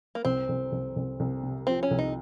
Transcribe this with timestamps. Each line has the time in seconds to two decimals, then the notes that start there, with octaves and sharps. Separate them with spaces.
0.15 A#3
0.25 C2 C4
0.49 C2
0.72 C2
0.96 C2
1.20 C2
1.43 C3
1.67 F3 C4
1.83 C#4
1.91 C2
1.99 D#4